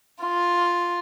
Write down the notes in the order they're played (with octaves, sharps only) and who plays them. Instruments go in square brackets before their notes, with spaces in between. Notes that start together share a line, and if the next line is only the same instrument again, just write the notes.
[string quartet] F4